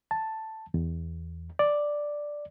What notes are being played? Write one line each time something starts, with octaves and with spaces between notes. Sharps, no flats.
A5
E2
D5